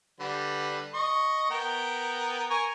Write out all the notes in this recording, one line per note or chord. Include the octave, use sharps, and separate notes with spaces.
D3 G3 B4
D#5 C#6
B3 A#4 G5
A#4 G#5 C#6